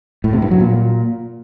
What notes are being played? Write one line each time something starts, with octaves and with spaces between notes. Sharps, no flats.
A2
C3
G2
F#3
A#2